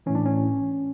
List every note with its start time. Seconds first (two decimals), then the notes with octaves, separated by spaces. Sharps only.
0.06 A2 E3 C#4
0.15 D4
0.25 C#4